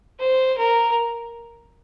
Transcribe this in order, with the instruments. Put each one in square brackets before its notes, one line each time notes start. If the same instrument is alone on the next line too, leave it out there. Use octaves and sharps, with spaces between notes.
[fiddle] C5
A#4